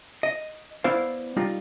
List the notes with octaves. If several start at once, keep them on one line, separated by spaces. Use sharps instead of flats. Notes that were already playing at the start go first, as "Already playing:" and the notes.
D#5
B3 E4 C5 D5 F5
G3 D#4 F4